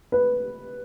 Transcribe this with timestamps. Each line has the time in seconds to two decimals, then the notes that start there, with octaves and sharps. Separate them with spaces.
0.12 B4